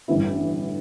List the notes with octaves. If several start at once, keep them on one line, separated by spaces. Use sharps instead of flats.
A1 G2 D3 B3 E4